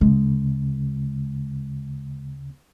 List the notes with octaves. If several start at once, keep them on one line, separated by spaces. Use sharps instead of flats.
D2 C#3 G#3